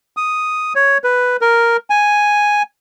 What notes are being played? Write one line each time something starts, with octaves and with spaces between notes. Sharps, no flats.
D#6
C#5
B4
A#4
G#5